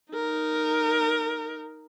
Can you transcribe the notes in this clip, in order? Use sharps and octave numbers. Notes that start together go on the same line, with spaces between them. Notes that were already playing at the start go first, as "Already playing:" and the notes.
D#4 A#4